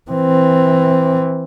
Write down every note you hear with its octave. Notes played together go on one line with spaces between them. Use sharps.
E3 C4